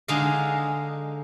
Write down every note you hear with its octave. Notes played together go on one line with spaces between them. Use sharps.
D3 G#3 D#4 F5